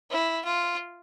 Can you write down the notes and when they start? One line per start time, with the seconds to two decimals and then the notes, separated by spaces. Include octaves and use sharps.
0.11 E4
0.45 F4